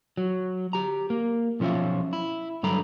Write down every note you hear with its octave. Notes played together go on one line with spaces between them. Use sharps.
F#3
G4 A#5
A#3
B1 F3 C#4 F4 E5
E4
G2 D3 F#3 A4 A#5 B5